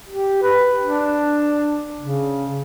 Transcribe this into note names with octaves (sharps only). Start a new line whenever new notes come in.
G4
B4
D4
C#3